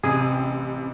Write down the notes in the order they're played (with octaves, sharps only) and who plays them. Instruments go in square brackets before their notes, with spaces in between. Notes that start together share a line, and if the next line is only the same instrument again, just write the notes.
[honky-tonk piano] A1 C3 [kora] G#4